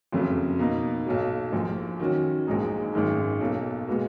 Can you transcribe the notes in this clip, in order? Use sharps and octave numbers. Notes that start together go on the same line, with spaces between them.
F#1 F2 C#3 F#3
B2 A#3 D#4
B1 A#2 F#3
A#1 A#2 F3
D#3 F#3 C#4 F#4
A#1 A#2 G#3 D#4
G#1 F#2 D#3 G#3
B1 B2 A#3
A#2 G#3 B3 F#4